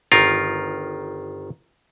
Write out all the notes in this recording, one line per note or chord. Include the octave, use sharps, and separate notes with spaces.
G1 D#3 F4 A#4